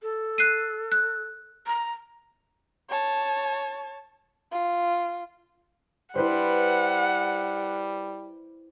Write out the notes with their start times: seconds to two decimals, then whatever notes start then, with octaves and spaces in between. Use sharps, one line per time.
0.02 A4
0.38 F#6 C7 D#7
0.92 F#6
1.67 A#5
2.90 C#5 A5
4.52 F4
6.15 G3 E4 B4 C5 F#5